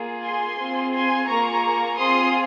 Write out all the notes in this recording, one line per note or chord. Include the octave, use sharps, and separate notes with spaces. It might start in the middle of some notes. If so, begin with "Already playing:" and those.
Already playing: A#3 F4 G#4
G#5 C6
C4 F4 G#4
G#5 C6
A#3 F4 G#4 A#5 C#6
C4 F4 G#4 C6 D#6